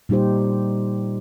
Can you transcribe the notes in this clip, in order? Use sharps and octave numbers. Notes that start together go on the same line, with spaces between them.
A#2 G3 D#4 G4 C5